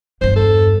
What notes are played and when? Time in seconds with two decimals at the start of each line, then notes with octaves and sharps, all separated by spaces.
0.21 E2 G2 C5
0.36 A4